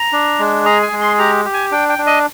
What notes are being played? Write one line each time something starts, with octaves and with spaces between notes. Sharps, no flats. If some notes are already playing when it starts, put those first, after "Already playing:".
Already playing: A#5
D4
G#3
G#4 A#5
G#5
G#3
C6
G4 A#5
G4
G#5
D4 G5
G5
D4
D#5